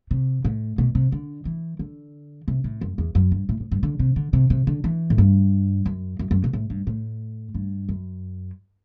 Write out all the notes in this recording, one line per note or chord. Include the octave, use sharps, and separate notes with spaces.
C3
A2
B2
C3
D3
E3
D3
C3
A2
F#2
E2
F#2
G2
A2
A2
G2
D3
C3
D3
C3
C3
D3
E3
A2
G2
F#2
F#2
F#2
B2
A2
G2
A2
G2
F#2